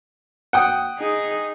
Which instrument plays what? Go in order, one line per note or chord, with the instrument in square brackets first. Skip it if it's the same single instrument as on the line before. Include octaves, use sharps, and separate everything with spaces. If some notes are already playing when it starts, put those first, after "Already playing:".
[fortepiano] F#5 G5 D#6
[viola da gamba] D#4 G#4